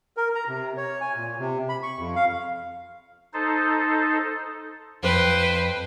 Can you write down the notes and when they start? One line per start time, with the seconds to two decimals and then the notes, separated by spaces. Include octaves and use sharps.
0.17 A#4
0.35 A#5
0.48 C3
0.77 C#5
1.01 G#5
1.16 A#2
1.39 C3
1.69 B5
1.83 C#6
1.99 F2
2.15 F5
3.34 D#4 A4 C5
5.03 F2 B4 C5 G5